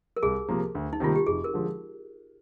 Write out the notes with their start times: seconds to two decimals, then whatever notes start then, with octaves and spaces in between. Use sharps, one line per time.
0.17 A#4
0.23 C2 G#4
0.48 C3 F3 A#3
0.75 D2
0.93 D#4
1.00 C3 D#3 G3 A#3 F4
1.16 G4
1.27 F1 G#4
1.44 A#4
1.54 D3 F3 G#3